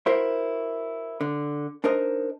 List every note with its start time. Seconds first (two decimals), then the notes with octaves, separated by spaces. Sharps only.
0.06 E4 F#4 A#4 C5 E5
1.21 D3
1.84 D4 D#4 A#4 C5 D#5